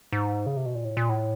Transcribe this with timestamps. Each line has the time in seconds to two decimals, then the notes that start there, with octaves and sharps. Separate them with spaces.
0.12 G#2
0.46 C#3
0.57 C3
0.66 B2
0.75 A#2
0.85 A2
0.97 A#2
1.09 A2